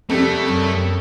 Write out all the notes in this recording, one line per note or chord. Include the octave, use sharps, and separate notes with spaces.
F2 C3 G3 A3
F#2